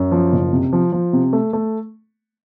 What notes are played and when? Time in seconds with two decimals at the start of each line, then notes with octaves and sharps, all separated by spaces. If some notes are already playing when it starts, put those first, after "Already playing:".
Already playing: F#2
0.12 F3
0.33 F#1
0.53 C3
0.73 F3
0.92 F3
1.13 C3
1.33 A3
1.53 A3